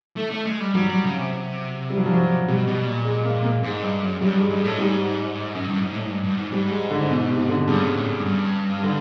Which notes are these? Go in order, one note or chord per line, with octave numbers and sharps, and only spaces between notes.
A3
A3
G#3
G3
F#3 G3
G3
C#3
C3
C3
G3
F#3
F3
F#3
B2 G3
B2
A#2
G#3
A#3
A#3
G#2 G#3
G2
F#2
F#2 G3
G2
G#3
G2
A2 G#3
G#2 G3
F#2
G2
G#2
A2
G#2
G2
G2
G#2
G#2 G3
G#3
D3
B2
C3
D3
G2 C#3
G#2
A2
G2
G2
D3